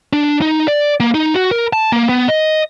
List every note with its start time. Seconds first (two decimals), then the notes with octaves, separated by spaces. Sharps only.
0.13 D4
0.41 D#4
0.68 D5
1.00 A#3
1.14 D#4
1.35 F#4
1.51 A#4
1.73 A5
1.92 A#3
2.09 B3
2.29 D#5